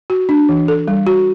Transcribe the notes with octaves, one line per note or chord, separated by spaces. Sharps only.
F#4
D4
E3
A4
G3
F#4